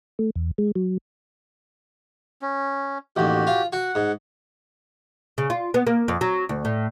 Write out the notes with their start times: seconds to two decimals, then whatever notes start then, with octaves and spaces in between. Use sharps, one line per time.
0.19 A3
0.36 E2
0.58 G#3
0.76 F#3
2.42 C#4
3.17 A1 D#2 F#4 G4
3.47 F4
3.73 F#4 F#5
3.95 G#2
5.38 C#3
5.50 F4
5.74 B3
5.87 A#3
6.08 F2
6.21 F#3
6.49 D2
6.65 A2